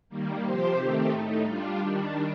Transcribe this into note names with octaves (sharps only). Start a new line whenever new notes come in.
D#3 G3 A#3
C3 F3 C4 G4 C5
D#3 A3 C4 G4
A2 A3 D#4
G3 D4 F4
D#3 G3 D4